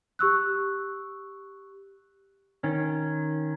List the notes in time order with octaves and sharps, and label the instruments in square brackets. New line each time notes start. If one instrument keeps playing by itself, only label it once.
[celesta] G4 C#6 E6 F#6
[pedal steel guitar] D#3 C#4